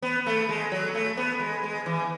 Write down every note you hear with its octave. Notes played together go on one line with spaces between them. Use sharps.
B3
A3
G#3
F#3
A3
B3
G#3
G#3
E3